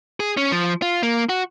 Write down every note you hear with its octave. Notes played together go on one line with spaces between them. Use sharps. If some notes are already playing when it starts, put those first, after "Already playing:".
G#4
C#4
F3
F4
A#3
F#4